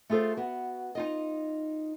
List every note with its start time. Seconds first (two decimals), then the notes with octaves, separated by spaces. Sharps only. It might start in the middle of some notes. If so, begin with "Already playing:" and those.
0.10 A3 F4 G#4 A4 C5
0.37 B3 F#4
0.95 D#4 F4 D#5